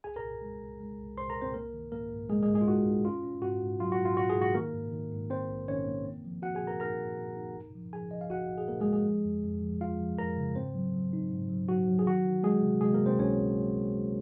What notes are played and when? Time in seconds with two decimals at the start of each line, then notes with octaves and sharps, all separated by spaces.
0.04 C2 G#4 G#5
0.16 A#4 A#5
0.23 C2
0.41 G#3
0.61 C2
0.80 G#3
0.98 C2
1.16 C2 C5 C6
1.30 A#4 A#5
1.35 C2
1.41 C4 C5
1.54 A#3 A#4
1.74 D#3
1.92 G#2 A#3 A#4
2.11 G#2
2.29 G#3 A#3 G#4
2.42 G#3 G#4
2.49 G#2
2.55 G#3 G#4
2.61 F4
2.67 D#4 F#4
2.86 D#4
3.05 C#4 F4
3.23 C#4
3.42 G#2 F#4
3.61 G#2
3.79 F#3 F4
3.92 F#4
3.99 G#2
4.05 F4
4.17 G#2 F#4
4.30 G#4
4.36 G#2
4.42 F#4
4.54 D#3 A#3 A#4
4.73 G#2
4.92 D#3
5.12 G#2
5.30 G#2 C4 C5
5.49 A#1
5.68 D#3 C#4 C#5
5.87 A#3
6.05 C4
6.25 F3
6.42 C4 F#4 F#5
6.55 G#4 G#5
6.62 A#2
6.67 A#4 A#5
6.80 D#4 A#4 A#5
7.00 A#2
7.18 A#2
7.37 D#4
7.55 G#1
7.75 F3
7.93 F3 G#4 G#5
8.11 F3 D#5
8.21 F5
8.30 G#1 F#4 F#5
8.49 G#1
8.58 G#4
8.68 G#1 A#3 A#4
8.80 G#3 G#4
8.87 G#1
8.93 G#3 G#4
9.06 F3
9.25 F2
9.43 F2
9.63 F3
9.81 F2 F4 F5
10.00 F3
10.18 F2 A#4 A#5
10.37 C#3
10.56 G#2 C4 C5
10.75 F#3
10.94 F#3
11.13 D#4
11.32 G#2
11.50 F#3
11.69 F#3 F#4
11.88 F#3
11.99 G#4
12.07 D#3 F#4
12.25 D#3
12.43 F#3 G#3 G#4
12.62 C3
12.81 C3 G#3 G#4
12.93 A#3 A#4
13.00 C3
13.06 C4 C5
13.19 C#2 C#4 C#5